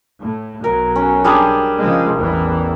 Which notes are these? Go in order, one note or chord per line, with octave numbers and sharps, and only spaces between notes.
A2
B1 F#3 A#4
C#4
G3 D4 G#4
C#3 F3 G#3
A1 E2 E3